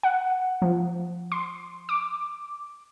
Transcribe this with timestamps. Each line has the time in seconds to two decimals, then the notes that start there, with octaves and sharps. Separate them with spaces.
0.03 F#5
0.62 F3
1.32 C6
1.89 D6